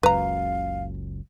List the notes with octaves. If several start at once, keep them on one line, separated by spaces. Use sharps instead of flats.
F#1 C#2 F#2 B4 F5 A#5